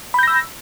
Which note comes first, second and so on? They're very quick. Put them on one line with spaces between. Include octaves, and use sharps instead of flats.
B5 G6 A#6 E6